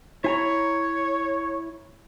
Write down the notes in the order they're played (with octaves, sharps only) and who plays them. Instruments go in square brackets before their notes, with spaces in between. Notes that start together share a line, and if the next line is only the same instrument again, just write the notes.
[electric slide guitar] E4 G#5 A#5 [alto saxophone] C#5